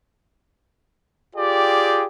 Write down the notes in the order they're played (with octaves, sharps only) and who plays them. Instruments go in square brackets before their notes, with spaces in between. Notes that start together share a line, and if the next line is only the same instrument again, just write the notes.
[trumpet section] F4 G4 G#4 D5 G5